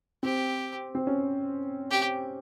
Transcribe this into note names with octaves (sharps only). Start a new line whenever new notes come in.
C4 G4
C4
C#4
G4